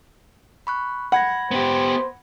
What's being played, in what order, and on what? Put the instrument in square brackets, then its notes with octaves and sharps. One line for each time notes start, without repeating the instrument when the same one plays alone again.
[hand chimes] B5 C#6 F#6
[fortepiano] F#5 [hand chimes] B5 G#6 A#6
[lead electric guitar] B3 G4 [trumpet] C5